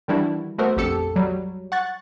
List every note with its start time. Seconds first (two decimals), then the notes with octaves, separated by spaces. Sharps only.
0.08 D#3 E3 G3 D4 E4 F#4
0.58 A3 B3 F#4 A4 A#4 C5
0.77 A#1 F2 G4 A4 A5 C#7
1.16 F#3 G3
1.72 F#5 C#6 F#6 A6